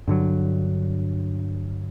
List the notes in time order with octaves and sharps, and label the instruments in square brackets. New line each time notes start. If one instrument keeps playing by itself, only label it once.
[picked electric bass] G2 D3 F#3